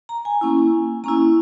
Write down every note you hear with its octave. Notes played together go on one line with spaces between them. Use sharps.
A#5
G#5
A#3 C#4 E4
A#3 C#4 E4 A#5